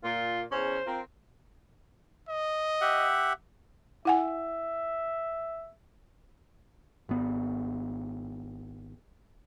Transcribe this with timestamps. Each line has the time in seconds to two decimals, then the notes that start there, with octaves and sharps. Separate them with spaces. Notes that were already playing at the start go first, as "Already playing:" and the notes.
0.04 A#2 F4
0.52 E2 C#4 C5
0.86 C4 F4 A#4
2.28 D#5
2.81 G4 E5 F#5
4.05 E4 E5 F#5 G#5
7.09 G#1 B3